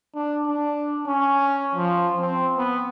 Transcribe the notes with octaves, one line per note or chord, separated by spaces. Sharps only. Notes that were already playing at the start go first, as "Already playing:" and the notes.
D4
D4
C#4
F3
C4
B3